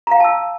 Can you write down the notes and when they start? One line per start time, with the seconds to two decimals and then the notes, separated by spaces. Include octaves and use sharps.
0.07 A#5
0.11 F5
0.16 G5
0.20 A5
0.24 E6